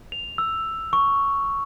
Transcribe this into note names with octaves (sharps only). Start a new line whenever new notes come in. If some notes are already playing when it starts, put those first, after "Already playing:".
F7
E6
C#6